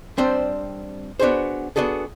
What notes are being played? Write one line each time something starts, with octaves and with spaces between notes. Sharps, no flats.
G3 C4 D4 C5
B3 D4 F#4 G#4 C5
B3 D4 F#4 G#4 A4